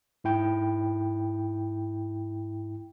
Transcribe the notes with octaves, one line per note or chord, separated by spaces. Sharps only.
G#2 E4 G5